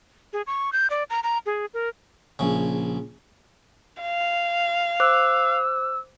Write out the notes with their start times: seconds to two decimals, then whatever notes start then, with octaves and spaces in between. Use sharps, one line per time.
0.33 G#4
0.47 C#6
0.73 G6
0.90 D5
1.10 A#5
1.23 A#5
1.46 G#4
1.74 A#4
2.39 A#1 C#3
4.02 F5
5.00 C5 D6 E6 F#6